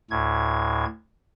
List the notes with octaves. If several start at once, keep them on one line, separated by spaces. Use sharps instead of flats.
D2 A2 G#6